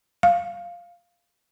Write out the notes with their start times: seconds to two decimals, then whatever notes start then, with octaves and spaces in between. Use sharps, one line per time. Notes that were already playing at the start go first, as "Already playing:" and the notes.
0.23 F5